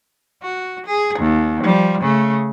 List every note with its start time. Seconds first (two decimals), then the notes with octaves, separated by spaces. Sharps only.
0.43 F#4
0.86 G#4
1.19 D#2
1.63 F3 G3
2.01 C#3 A3